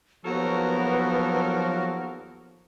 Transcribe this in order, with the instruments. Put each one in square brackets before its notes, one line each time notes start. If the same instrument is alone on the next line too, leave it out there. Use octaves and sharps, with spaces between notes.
[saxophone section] D#2 A4 A#4 [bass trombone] F3 [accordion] F#3 F#4 [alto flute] B3